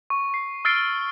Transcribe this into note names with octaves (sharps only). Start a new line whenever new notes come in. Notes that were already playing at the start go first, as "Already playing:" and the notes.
C#6
C7
E6 F6 A6 C7 D7 G7